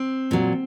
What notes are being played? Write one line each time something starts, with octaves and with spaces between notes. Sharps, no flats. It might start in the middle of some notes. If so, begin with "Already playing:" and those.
Already playing: C4
A#2 F#3